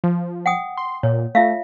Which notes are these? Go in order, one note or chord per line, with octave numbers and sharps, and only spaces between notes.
F3
F#5 G5 D#6
C6
A#2 C#5
A3 F4 E5 F5